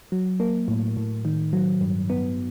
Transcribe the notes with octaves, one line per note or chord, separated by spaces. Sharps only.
F#3
A#3
A2
A2
D#3
F#3
G2
B3